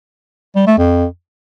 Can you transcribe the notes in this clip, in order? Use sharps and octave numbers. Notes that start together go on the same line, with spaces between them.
G3
A3
F2